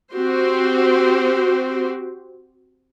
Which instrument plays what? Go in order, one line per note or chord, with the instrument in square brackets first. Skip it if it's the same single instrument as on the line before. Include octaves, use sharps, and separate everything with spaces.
[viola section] C4 F#4 G4 C5